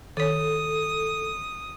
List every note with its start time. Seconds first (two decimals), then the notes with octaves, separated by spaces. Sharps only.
0.17 D#3 A4 C#5 D#6